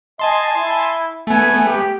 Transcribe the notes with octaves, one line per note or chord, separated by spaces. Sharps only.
D#5 G#5 A5 C6
E4
A3 B3 G#5
G4